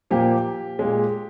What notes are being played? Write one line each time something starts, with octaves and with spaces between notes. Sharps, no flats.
A#2 F3 A#3 G4
A#2 G#3